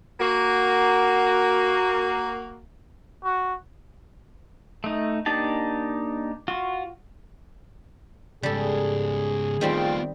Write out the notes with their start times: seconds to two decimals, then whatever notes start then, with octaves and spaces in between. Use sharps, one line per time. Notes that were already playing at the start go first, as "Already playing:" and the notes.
0.20 A#3 F#4
3.24 F#4
4.84 A3 D#4
5.26 A#3 D4 D#4 G4 A5
6.48 F4 F#4
8.43 G#2 C#3 G3 G#4 A4
9.61 D#3 G3 A3 B3 C4 F4 G5